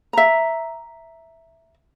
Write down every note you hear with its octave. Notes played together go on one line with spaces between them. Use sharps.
E5 A#5